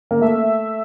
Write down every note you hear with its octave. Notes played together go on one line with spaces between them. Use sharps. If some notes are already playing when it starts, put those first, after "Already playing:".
A#3
A3 E5